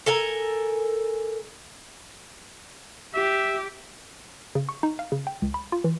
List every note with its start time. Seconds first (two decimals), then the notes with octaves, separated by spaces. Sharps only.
0.06 A4 A#4 G#5 A#5
3.14 G4 E5
4.55 C#3
4.69 C#6
4.83 D#4
4.99 F5
5.12 C#3
5.27 G5
5.42 C#2
5.54 B5
5.72 F4
5.84 E3